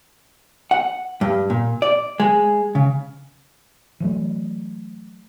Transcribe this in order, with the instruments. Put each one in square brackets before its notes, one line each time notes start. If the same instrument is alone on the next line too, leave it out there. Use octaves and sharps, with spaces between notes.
[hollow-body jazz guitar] F#5
G2
A#2
D5
G#3
C#3
[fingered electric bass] E3 F#3 A3